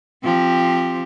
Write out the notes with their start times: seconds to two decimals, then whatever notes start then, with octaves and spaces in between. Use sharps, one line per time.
0.24 F3 C4 G4